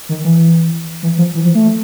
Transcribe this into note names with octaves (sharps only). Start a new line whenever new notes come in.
D#3
E3
E3
F3
E3
F3
A3